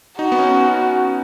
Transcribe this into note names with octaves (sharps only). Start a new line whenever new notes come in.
D#4 F#4
B3
C#4